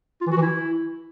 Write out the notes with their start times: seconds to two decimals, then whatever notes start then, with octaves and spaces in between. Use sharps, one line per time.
0.21 F4
0.26 E3
0.32 F#4
0.37 E3
0.42 E4